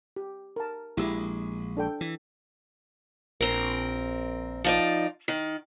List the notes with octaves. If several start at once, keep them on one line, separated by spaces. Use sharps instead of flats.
G4
A#4 A5
A#1 G#3 E4 G4 E6
D4 A4 G5
E3
A#1 C4 A#4
F3 D#4 D5
D#3